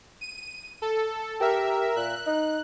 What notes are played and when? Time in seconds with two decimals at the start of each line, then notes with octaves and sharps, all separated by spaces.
0.21 D#7
0.82 A4
1.41 G4 A#4 E5
1.96 A#2 F#6
2.27 D#4